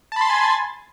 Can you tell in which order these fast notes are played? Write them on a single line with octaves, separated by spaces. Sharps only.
A5 B5 C6 A6 G#5